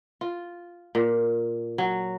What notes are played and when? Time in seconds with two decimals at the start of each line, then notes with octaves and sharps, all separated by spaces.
0.21 F4
0.95 A#2
1.78 F#3